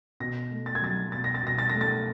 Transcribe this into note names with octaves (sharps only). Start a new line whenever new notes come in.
B2 A#6
A3
A6
G#6
F#3 A6
B2 A6
A#6
A6
B2 A#6
A6
A3 A#6
A6